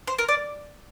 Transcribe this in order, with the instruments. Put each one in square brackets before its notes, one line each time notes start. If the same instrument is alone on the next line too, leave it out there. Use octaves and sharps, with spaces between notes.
[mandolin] C5
A#4
D5